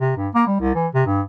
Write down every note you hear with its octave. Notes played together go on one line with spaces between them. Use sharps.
C3
G2
A#3
G3
C2
E3
C3
G2